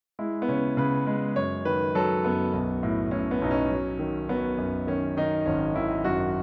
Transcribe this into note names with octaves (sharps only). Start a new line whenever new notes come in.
G#3 E4
B3
C#3 C#4
C#3 B4
G#3
F#2 C#5
D#3 B4
F#3 A4
F#2 B3
B1
A2
A2 C#4
B3
B1 D#4
C#4
F#3
D#3
F#3 B3
F#2
D#3 C#4
D#3 D#4
G#1 C#4
D#3 E4
F#2 F#4